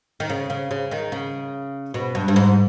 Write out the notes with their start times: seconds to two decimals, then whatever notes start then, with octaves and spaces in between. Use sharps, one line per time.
0.20 D#3
0.30 C#3
0.50 C#3
0.71 C#3
0.91 D#3
1.12 C#3
1.94 B2
2.15 G2
2.28 G2
2.36 G#2